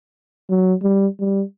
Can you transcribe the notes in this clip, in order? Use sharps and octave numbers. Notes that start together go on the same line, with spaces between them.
F#3
G3
G3